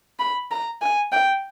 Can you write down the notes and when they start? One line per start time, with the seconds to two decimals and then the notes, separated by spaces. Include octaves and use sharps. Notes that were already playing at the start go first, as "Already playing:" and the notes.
0.19 B5
0.51 A#5
0.81 G#5
1.12 G5